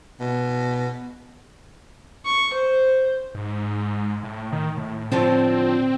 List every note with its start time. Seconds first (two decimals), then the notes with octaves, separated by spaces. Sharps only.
0.20 B2
2.25 C#6
2.53 C5
3.35 G#2
4.23 A2
4.52 D#3
4.77 A2
5.12 A2 D3 F3 C4